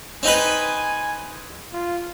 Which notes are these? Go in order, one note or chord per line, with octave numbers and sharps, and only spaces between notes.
C4 D#4 B4 G#5
F4